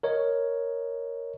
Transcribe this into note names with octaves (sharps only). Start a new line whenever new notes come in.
A#4 C#5 D#5